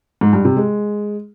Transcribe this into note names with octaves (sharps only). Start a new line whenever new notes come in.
G#2
G2
C3
G#3